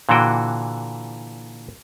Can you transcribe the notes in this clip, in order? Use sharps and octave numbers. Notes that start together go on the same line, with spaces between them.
A#2 D3 E3 F#4 G5